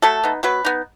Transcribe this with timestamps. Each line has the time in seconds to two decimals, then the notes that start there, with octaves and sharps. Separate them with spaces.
0.02 F#3 A3 A4
0.24 B3 D#4
0.43 F#3 B3 B4
0.65 B3 D#4